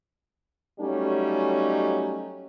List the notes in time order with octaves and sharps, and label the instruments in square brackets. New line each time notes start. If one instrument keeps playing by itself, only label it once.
[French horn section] F#3 G3 A3 C#4 D#4